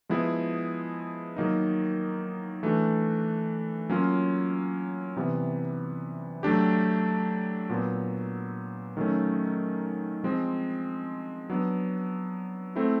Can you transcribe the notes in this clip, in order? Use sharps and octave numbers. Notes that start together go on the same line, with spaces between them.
F3 G#3 B3 E4 G#4
D#3 F#3 A#3 D#4
E3 A3 D4 F#4
F#3 A#3 C#4 F4
C3 E3 G3 B3
F#3 A3 D4 G4
A#2 F#3 B3
D#3 F#3 A3 C#4
F3 G#3 C4
F#3 B3 D4
A3 C4 E4